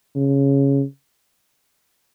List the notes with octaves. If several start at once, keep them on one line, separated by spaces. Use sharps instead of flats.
C#3